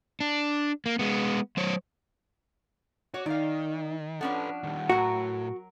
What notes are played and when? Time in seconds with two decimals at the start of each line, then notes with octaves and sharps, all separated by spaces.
0.20 D4
0.86 A#3
0.99 G#3 B3
1.57 F#3 C5 C#5
3.14 F#4 C#5 D6
3.26 D#3 D#4 D5 F5
4.21 F3 C#4 D4 A4 B4 F#5
4.64 D#3 G3
4.89 A2 F#3 F#4 A#4